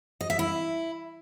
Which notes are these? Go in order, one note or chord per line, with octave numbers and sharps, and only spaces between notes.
D#5
E5
E4